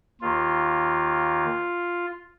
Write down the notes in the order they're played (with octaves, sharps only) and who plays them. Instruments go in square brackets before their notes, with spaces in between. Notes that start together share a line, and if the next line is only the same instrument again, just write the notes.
[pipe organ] D#2 D#3 F4